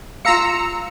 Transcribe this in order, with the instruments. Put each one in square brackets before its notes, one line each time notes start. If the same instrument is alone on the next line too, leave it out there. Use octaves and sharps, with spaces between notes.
[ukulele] F4 F5 [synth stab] A#5 E6 C#7